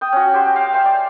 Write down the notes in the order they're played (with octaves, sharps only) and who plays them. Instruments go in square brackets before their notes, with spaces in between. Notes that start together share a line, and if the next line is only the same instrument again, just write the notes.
[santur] G5 D#6
C#4 F#4
G4 C5
F5 G5
C5 E5 G#5
D5